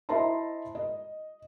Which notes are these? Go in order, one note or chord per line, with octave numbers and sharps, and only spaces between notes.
E4 C5 D#5 A5 A#5 C6
D#5